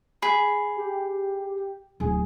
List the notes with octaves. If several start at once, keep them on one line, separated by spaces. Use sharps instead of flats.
G#4 B5
G4
D1 G#4